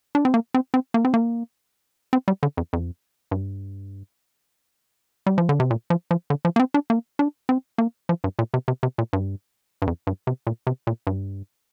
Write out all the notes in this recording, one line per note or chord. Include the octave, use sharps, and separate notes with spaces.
D4
C4
A#3
C4
C4
A#3
C4
A#3
C4
G3
D3
F2
F2
G2
G3
F3
D3
C3
A#2
F3
F3
D3
F3
A#3
C4
D4
A#3
D4
C4
A#3
F3
G2
A#2
C3
C3
C3
A#2
G2
G2
F2
G2
C3
A#2
C3
A#2
G2